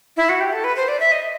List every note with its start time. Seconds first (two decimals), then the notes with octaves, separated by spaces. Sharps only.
0.17 E4
0.29 F#4
0.41 G4
0.53 A4
0.64 B4
0.76 C5
0.88 D5
1.00 E5
1.12 D#5